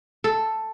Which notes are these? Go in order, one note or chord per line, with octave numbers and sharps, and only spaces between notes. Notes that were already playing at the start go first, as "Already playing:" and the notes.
A4